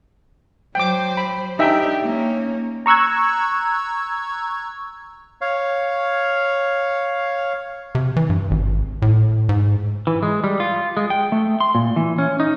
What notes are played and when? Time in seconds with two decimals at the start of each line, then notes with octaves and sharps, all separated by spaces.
0.75 F#3 C5 G5 D6
1.17 B5
1.59 D4 D#4 G4 E5 G5
2.03 A#3 C#4
2.86 A#5 C#6 E6 F#6 G#6
5.41 C#5 F5
7.95 C3
8.16 E3
8.30 G2
8.51 G#1
9.02 A2
9.49 G#2
10.07 E3
10.23 G#3
10.44 G3
10.60 F4
10.97 G#3
11.10 G5
11.32 A3
11.61 C6
11.75 A#2
11.96 E3
12.18 C#4
12.40 D#4